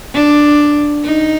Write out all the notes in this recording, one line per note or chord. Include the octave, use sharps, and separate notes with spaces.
D4
D#4